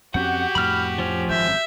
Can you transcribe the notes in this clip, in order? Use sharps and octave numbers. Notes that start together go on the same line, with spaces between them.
F2 C4 C#4 F#4 G4 F#5 G6
F2 A2 B5 F6
F3 C#4
G#1 F#2 E5 G6